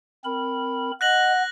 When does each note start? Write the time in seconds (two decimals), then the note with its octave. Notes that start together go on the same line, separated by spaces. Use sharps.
0.25 C4 A#4 B5
1.01 D#5 F#5 F#6 A#6 F#7